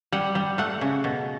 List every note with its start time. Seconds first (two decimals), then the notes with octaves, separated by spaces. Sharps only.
0.12 G3 F#5
0.35 G3
0.58 A3 F#5
0.81 C#3
1.04 B2